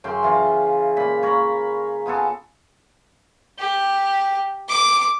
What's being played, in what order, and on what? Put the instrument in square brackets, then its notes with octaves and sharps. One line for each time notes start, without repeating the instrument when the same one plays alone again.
[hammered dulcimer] F#2 C#3 G5 C6
E3 F4
A#2 B5
A#4 C#5 A#5 B5
B3 F4 G#4 A4
[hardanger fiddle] G4
D6